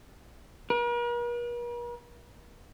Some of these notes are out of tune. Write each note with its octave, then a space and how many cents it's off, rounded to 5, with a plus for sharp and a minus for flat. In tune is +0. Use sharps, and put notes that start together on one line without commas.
A#4 +45